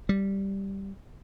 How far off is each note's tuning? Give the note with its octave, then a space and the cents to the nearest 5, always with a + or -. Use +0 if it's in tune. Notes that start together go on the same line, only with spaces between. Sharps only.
G3 -5